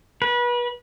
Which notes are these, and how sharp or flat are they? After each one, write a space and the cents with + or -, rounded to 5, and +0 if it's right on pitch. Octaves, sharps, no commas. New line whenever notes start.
B4 -30